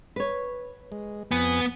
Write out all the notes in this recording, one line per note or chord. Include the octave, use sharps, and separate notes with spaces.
B4 C#5
G#3
F2 B3 G#5